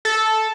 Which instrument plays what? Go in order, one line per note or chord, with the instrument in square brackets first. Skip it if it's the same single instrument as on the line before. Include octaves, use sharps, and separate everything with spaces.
[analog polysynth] A4